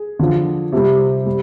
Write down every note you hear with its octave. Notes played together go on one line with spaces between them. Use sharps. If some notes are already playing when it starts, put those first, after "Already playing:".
Already playing: G#4
D3 F3
C3 G3
G3